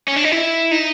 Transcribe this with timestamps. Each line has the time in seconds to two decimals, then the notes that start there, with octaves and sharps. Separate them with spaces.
0.08 C#4
0.16 D4
0.24 D#4
0.32 E4
0.71 D#4